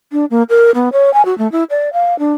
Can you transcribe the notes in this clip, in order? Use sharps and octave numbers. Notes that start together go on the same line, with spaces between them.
D4
A#3
A#4
B3
C#5
G#5
F#4
A3
E4
D5
F5
D4